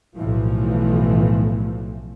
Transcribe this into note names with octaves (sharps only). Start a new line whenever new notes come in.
B1 A2 E3 F3 A3